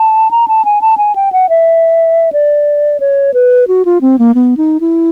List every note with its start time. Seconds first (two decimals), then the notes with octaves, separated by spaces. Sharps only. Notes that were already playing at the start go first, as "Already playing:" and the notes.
Already playing: A5
0.31 A#5
0.48 A5
0.65 G#5
0.81 A5
0.98 G#5
1.16 G5
1.32 F#5
1.49 E5
2.33 D5
3.00 C#5
3.34 B4
3.68 F#4
3.85 F4
4.01 C4
4.19 A#3
4.35 B3
4.57 D#4
4.80 E4